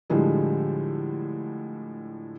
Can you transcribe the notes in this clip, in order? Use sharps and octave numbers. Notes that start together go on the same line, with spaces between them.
A2 D3 F3 G3 G#3